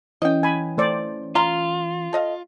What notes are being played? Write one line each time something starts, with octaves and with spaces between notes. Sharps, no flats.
E3 C#4 D#5 G5
G#5 B5
A3 C5 D5
F4 F5 A#5 C6
A4 D#5 F5